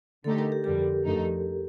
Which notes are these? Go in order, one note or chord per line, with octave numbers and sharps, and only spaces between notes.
D3 A3 D#4 G4 A4
A#4
G4
F2 D3 G3 G4
F2 D3 A3 D#4